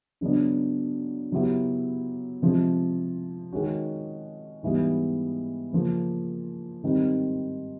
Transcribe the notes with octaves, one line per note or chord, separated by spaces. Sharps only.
C#3 F#3 B3 D4
C#3 F#3 B3 E4 G4
C3 F3 G#3
D#3 G#3 C#4 F#4
G#2 E3 G3 B3
C#3 F3 A#3
G#2 D#3 G3 C4